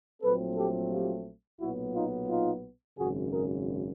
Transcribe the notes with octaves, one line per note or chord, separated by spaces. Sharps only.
A#1 A#2 F#3 A3 C4 A4 B4
G4 A4
F4 G4
B1 A#2 F#3 B3 E4 F#4
D#4 F4
D#4 F4
G#1 F#2 C#3 F#4 G#4
G#4 A#4